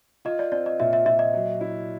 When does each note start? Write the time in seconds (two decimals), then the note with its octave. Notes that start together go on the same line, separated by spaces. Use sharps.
0.25 F4 D#5
0.39 D5
0.52 C4 D5
0.66 D#5
0.80 A#2 E5
0.93 E5
1.06 A#2 E5
1.19 D#5
1.34 F#3
1.61 E4